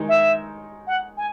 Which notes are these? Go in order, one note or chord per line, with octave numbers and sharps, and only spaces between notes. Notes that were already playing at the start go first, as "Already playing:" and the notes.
Already playing: D#3 G#3 D#4
E5
F#5
G#5